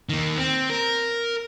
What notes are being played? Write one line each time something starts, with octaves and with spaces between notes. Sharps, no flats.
D#3 A#3
C4
A#4